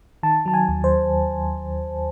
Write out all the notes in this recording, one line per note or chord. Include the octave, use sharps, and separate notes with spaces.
D#3 A5
F#3 A5
G#5
D#2
C5